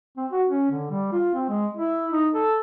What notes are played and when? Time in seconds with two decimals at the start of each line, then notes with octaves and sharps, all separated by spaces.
0.17 C4
0.32 F#4
0.48 C#4
0.71 D3
0.91 G3
1.12 F4
1.35 C4
1.49 G#3
1.77 E4
2.12 D#4
2.34 A4